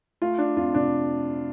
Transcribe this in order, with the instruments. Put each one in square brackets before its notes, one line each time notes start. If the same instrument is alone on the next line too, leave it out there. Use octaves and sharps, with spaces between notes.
[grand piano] A3 F4
D4
F2 F4
C3 D4